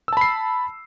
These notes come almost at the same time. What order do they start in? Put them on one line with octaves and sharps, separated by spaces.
E6 A5 B5 C7